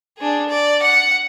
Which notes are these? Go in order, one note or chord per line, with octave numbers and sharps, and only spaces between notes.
D4 G#4
D5
F#5